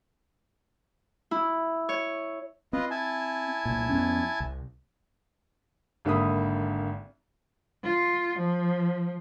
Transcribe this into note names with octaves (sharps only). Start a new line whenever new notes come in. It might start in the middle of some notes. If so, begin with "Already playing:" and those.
E4
C#5
C4 F4 B4 D#5
E4 G#5 A5
C2 A#2
F2 B3 C#4
C2
G#1 D3 A#3 E5 B5 D#6
F4
F3